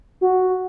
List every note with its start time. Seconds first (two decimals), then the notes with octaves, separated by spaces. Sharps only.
0.21 F#4